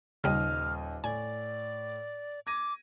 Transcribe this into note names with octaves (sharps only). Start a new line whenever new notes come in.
D#1 D#2 C#3 G3 D#5 F6
A2 D5 G#5
D6 G#6 A#6 D#7